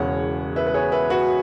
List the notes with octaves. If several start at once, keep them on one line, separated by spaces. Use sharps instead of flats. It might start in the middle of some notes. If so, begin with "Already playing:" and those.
Already playing: E1 E2 C#3 C#5 F#5
B4 E5
B4
G#4 C#5
B4 E5
F#4 B4